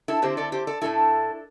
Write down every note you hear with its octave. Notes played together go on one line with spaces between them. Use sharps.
E4 A4
D3 C4 E4 G4 C5
A4 D5
G4 C5
A4 D5
A2 A3 D4 E4 A4